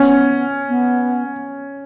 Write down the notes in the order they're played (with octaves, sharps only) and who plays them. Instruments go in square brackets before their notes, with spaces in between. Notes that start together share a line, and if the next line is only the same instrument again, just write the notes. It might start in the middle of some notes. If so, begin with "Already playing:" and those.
Already playing: [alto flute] B3 [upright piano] C#4
[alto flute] B3